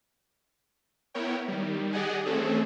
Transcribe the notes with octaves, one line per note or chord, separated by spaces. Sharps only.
B3 E4 A#4 C#5 G5
D#3 G3
G4 G#4 D5 D#5 F#5 G#5
E3 A3 C4 C#4 G#4 A4